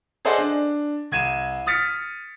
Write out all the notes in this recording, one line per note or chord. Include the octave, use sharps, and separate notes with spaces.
G#4 A4 C5 D5 D#5 F#5
D4
C2 G#6 D#7 E7
D#6 F6 A6 B6 C#7